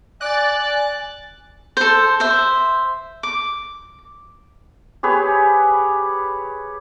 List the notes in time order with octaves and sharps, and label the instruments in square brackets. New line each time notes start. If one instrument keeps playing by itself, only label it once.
[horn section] D5 [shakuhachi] G#5 [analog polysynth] F#6 A6
[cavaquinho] A4 C5
C5 E5
D6
[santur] G4 G#4 B4 C#5